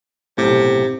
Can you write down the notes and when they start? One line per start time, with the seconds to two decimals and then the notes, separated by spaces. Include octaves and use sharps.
0.38 B1 A2 C3